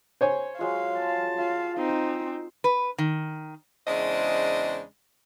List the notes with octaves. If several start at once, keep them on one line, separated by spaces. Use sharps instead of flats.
C5 C#5 G#5
F#3 G#3 F4 F5
A5
F4 F5
C4 D#4
B4
D#3
E2 C#3 G#3 D4 C5 D#5